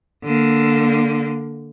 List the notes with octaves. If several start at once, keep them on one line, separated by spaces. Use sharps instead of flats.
D3 A#3